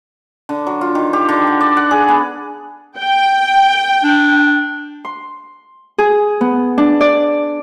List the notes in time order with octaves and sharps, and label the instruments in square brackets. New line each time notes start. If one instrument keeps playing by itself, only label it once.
[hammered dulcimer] D3
F#3
F4
D#3
G4
D3
F#5
D5
F#5
G#4
B3
[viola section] G5
[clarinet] D4
[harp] C6
G#4
B3
D4
D5